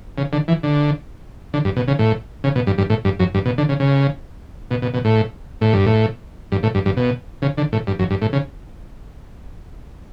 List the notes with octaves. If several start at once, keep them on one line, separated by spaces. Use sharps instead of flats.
C#3
D3
E3
D3
D3
G2
B2
C#3
A2
C#3
B2
G2
G2
A2
G2
F#2
G2
B2
D3
C#3
C#3
B2
B2
B2
A2
A2
G2
A2
G2
A2
G2
G2
B2
C#3
D3
A2
G2
F#2
G2
A2
C#3